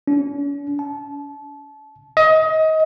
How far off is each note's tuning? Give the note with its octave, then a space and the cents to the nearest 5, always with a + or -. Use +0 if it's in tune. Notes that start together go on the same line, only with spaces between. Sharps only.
C#4 +45
A5 -25
D#5 +25